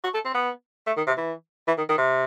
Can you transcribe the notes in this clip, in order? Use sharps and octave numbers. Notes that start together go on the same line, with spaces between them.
F#4
A4
C4
B3
A3
D#3
C3
E3
E3
D#3
D#3
C3